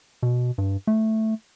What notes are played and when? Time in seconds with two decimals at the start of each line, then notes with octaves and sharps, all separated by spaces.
0.23 B2
0.58 G2
0.87 A3